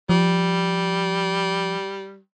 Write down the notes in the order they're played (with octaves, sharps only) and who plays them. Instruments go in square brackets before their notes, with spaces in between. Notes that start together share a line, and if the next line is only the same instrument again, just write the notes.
[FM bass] F3 [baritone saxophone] G3